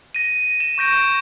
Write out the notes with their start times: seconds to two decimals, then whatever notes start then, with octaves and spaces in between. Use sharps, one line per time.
0.15 A#6 D#7
0.60 A#6 E7
0.78 C#6 G6 A#6 D7